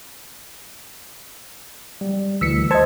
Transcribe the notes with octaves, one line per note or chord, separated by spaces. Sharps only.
G3
D2 E3 E6 B6 C#7
C5 D#5 A5 G#6